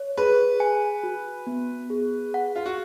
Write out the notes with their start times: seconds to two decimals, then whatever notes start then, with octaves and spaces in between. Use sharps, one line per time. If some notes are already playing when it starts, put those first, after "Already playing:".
Already playing: C#5
0.17 G#4 B4
0.60 G#5
1.03 F#4
1.47 B3
1.90 G#4
2.34 F#5
2.56 F4
2.66 F#4